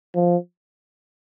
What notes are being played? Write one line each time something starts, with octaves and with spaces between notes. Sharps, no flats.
F3